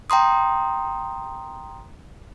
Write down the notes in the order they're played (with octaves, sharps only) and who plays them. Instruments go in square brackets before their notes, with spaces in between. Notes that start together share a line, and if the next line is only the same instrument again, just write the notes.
[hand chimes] G5 A#5 C6 D#6